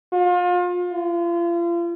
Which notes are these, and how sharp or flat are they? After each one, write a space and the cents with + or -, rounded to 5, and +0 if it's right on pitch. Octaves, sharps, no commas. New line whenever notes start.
F4 +35
F4 -35